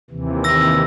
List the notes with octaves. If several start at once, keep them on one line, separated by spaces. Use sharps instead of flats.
D#2 C3 E3
E6 A#6